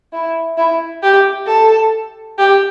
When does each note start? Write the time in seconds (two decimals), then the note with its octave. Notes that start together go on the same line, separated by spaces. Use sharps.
0.13 E4
0.57 E4
1.03 G4
1.47 A4
2.38 G4